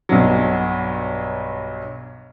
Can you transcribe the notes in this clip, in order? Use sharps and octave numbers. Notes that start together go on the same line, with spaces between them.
B1 G2 F#3